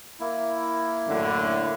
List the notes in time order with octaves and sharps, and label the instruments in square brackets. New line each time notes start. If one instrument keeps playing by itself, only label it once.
[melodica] A#3 E4
[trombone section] F#2 A2 D3